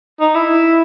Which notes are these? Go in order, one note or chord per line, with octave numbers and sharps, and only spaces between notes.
D#4
E4